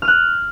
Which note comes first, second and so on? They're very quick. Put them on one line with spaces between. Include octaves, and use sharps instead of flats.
F6 D#7 F#6